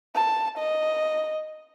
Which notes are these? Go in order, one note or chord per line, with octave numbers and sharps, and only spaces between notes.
A5
D#5